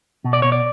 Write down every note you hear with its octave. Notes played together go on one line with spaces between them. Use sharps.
B2
D5
B2 C#5
D5